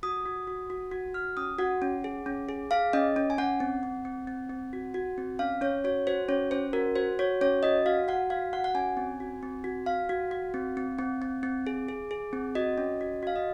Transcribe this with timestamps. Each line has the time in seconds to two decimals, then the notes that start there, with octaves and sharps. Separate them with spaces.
0.03 F#4 D#6
0.25 F#4
0.47 F#4
0.70 F#4
0.91 F#4
1.14 F#4 F6
1.37 C#4 D#6
1.59 F#4 F#5
1.82 C#4
2.04 G#4
2.26 C#4
2.49 G#4
2.71 G#4 F5
2.93 C#4 D#5
3.16 C#4
3.30 G#5
3.38 C#4 F#5
3.60 C4
3.83 C4
4.05 C4
4.27 C4
4.50 C4
4.73 F#4
4.94 F#4
5.18 C4
5.39 C#4 F5
5.61 C#4 C#5
5.84 F#4 C#5
6.07 F#4 C5
6.29 C#4 C#5
6.51 C#4 C5
6.73 F#4 A#4
6.95 F#4 C5
7.19 F#4 C#5
7.41 C#4 C#5
7.63 F#4 D#5
7.86 F#4 F5
8.08 F#4 F#5
8.30 F#4 F5
8.53 F#4 F#5
8.64 F#5
8.75 C#4 G#5
8.97 C4
9.20 F#4
9.43 C4
9.64 F#4
9.86 F#4 F5
10.09 F#4
10.31 F#4
10.54 C4
10.77 C4
10.98 C4
11.22 C4
11.43 C4
11.67 G#4
11.89 G#4
12.11 G#4
12.33 C4
12.55 F#4 D#5
12.78 C#4
13.01 F#4
13.23 F#4 F5
13.36 D#5